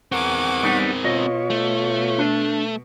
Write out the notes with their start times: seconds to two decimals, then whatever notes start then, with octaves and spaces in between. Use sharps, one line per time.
0.12 E2 C4 A#4 F#5 G#5 C#6 D6
0.63 G3 B3 D#4
1.04 B2 F4 C#5 D#5
1.50 A3
2.18 D4